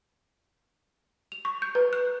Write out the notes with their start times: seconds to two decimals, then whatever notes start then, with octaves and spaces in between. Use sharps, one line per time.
1.32 F7
1.45 C#6
1.62 G6
1.75 B4
1.93 F#6